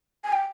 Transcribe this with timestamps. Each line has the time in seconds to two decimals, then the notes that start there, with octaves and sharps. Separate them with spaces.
0.24 G#5
0.32 G5